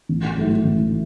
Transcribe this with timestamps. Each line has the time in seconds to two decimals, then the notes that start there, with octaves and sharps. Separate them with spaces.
0.09 A1
0.38 G#2 F#3 A3 E4
0.64 A1